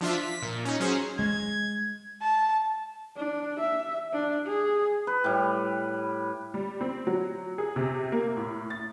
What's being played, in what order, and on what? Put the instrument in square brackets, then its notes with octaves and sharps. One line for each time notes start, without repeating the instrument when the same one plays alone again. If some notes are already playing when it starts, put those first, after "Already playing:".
[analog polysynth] F3 D4 F4 E5
B6
A#2
C#4 D#4
F#3 C#4 G#4 C5
[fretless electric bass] G#3 [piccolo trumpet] G#6
[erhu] A5
[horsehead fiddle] D4
E5
D4
G#4
[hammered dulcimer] B4
A2 G3
[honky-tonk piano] G3
C4
F#3
G#4
C3
A#3
A2
A6